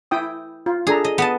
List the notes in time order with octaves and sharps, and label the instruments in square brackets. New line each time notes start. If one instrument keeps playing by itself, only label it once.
[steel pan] E4 G5 D#6
F4
[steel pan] D4 A4 A#5 [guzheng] G#4
[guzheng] D#5
B3 D#5 A5